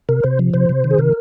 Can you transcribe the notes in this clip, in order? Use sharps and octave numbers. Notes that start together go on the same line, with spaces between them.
C3 A#4
C3 C5
F3
C3 C5
C3
D#3
G#4
C3 A#4